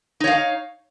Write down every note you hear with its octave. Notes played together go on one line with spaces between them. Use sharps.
D#4 C#5 F5